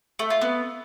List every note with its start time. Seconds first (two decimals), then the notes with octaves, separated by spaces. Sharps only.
0.19 A3
0.30 F4
0.41 B3